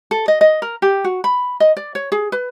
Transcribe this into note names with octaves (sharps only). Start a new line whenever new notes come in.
A4
D#5
D#5
A#4
G4
F#4
B5
D#5
D5
C#5
G#4
B4